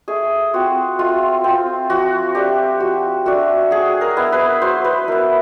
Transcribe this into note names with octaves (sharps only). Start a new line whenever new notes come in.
A3 G#4
C4 F4 F#4
A3 F4
C4 F4
F3 F#4
A3 D4 G4
F3 F#4
A3 D4 F#4
F#3 G#4
A#4
B3 E4
B4
F#3 C5
B4
B3 E4 A#4